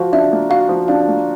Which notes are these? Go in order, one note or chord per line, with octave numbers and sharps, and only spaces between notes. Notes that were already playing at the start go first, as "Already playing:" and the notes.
Already playing: F3 F#4
D4 E5
A#3
F#4 F5
F3
D4 F5
A#3